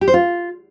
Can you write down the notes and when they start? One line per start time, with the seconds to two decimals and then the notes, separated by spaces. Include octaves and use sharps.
0.01 G4
0.08 C5
0.14 F4